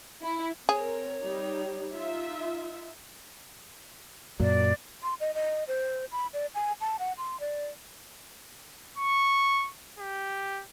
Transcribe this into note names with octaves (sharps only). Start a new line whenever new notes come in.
E4
C4 G#4 A#4 C#5
G3 D#4 G4
D#4 F4 E5
F#2 A#2 F#3 D5
C6
D#5
D#5
C5
B5
D5
G#5
A5
F#5
C6
D5
C#6
G4